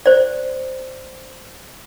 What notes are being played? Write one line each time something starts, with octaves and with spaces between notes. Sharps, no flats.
C5 D5